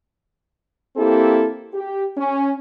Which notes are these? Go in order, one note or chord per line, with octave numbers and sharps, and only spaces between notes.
A#3 C4 E4 G4 A4
G4
C#4